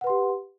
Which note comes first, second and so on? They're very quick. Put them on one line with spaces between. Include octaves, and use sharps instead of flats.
F#5 B4 C6 G4